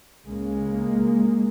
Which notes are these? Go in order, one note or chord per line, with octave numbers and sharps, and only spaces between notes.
C#2 C#3 G#3 A#3